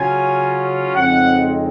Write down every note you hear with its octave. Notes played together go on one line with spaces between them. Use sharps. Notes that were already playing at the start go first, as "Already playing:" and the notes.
Already playing: C#3 F#3 C#4 F4 G#5
F2 C#3 G#3 C4 D#4 F#5